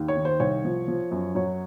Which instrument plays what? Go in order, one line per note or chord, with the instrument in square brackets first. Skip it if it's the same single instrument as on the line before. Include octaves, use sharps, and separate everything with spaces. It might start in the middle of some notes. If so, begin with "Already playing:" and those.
Already playing: [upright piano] D#2
C#5
D#3
C5
C2 C#5
F3
F3
F#2
F#3 C#5